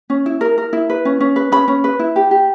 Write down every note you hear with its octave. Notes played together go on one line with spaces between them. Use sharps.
C#4
E4
A#4
A#4
E4
B4
C#4
C#4
B4
C#4 B5
C#4
B4
E4
G4
G4